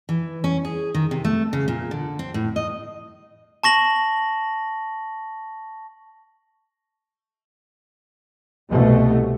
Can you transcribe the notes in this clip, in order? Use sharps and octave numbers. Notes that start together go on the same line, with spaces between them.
E3
C#4
G#4
D#3
C3
A3
C#3
A#2
D3
C4
A2
D#5
A5 C#6 A#6 F#7
C2 B2 A3